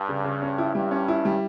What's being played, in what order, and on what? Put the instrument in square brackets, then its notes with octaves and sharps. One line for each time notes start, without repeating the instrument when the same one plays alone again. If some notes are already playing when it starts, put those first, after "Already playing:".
Already playing: [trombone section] G2
[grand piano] C#3
C#3
C#4
E4
[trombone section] G2 [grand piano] G3
[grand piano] C#4
E4
G3